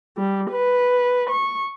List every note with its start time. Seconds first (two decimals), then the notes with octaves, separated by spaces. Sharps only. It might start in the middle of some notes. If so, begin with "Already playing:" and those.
0.17 G3
0.51 B4
1.30 C#6